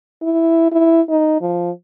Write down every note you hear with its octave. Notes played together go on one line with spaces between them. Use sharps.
E4
E4
D#4
F3